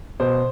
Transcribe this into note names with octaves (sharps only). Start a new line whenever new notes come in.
B2 C5